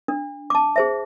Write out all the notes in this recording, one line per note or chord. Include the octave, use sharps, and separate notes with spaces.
D4
A5 D6
G#4 C5 E5